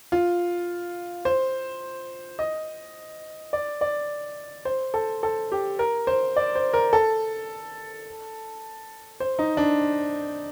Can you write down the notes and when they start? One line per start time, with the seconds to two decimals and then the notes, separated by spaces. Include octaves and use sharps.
0.12 F4
1.25 C5
2.39 D#5
3.53 D5
3.81 D5
4.65 C5
4.94 A4
5.23 A4
5.52 G4
5.79 A#4
6.07 C5
6.36 D5
6.55 C5
6.74 A#4
6.93 A4
9.20 C5
9.39 D#4
9.57 D4